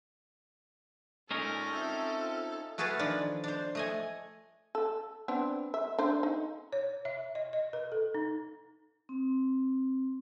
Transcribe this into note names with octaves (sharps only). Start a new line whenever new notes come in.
A#2 G#3 C#4 D#4 A4 A#4
C4 F4 G#4 E5 G5
A3 F#4 G#4 A4 B4 F5
D#3 F3 D4
D4 C5
A3 D#5 G#5
A4
B3 C4 D4
E5
D4 C5
D#4
C#5
E5
D#5
D#5
B4
A4
D#4
C4